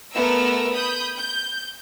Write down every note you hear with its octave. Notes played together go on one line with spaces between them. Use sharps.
A3 B3 A#4 A#5 E6
B5 D#6 G6
G6